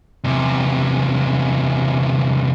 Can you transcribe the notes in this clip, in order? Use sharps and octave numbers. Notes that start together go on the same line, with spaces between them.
E2 C3